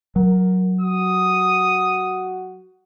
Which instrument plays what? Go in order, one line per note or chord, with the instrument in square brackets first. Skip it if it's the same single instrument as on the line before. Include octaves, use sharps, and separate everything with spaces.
[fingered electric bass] F#3 [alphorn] A#4
[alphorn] F#4 [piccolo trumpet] D#6